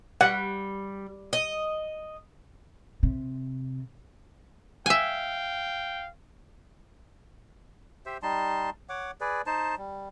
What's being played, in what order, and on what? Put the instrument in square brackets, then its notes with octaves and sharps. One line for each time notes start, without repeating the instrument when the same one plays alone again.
[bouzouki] G3 [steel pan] F#5
[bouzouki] D#5
[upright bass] C3
[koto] E5 G#5 [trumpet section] F5 G5
[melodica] G4 C5 E5
G3 D#4 A5 C6
C#5 F#5 D6
G#4 B4 D5
D#4 C5 A5
G3